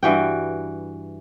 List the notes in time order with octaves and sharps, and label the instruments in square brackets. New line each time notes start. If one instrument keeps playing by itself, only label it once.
[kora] G2 E3 F#4 G5